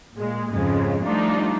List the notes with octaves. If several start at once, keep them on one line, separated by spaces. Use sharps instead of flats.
A#2 G#3
F2 G#2 C#3 G#3
F3 G3 A3 D4 D#4 F4